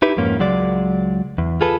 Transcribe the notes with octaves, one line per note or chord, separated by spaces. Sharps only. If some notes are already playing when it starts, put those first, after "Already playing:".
D#4 E4 G4 B4
F2 G#2 A#3 C#4
C#2 F#3 G#3 D5
E2
F4 G#4 A4 B4